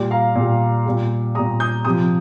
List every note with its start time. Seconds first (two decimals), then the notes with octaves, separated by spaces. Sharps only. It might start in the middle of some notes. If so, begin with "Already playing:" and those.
Already playing: A#2 G3
0.11 F5 A#5
0.35 A#2 G3
0.86 A#2 G3
1.35 A#2 G3 A#5 D#6
1.60 D#6 G6
1.85 C3 F3 D#6 G6